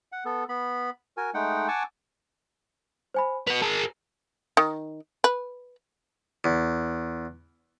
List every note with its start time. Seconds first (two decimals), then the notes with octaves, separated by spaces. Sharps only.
0.12 F#5
0.25 B3 A4
0.49 B3 B5
1.17 F#4 A#4 G#5
1.34 G#3 A3 D#4 F#5 G5
1.68 F#5 G#5 A5 C#6 D6 E6
3.14 C5 G#5 B5
3.47 F#4 B4 F7
3.62 G#4 A#4 A5
4.57 D#3
5.24 B4
6.44 E2